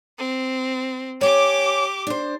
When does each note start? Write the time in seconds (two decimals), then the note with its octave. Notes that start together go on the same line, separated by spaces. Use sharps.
0.18 C4
1.21 G4 C#5 G#5 D6
2.07 D4 C5